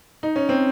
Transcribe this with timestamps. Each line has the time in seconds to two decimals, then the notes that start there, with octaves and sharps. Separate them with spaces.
0.23 D#4
0.36 C#4
0.49 C4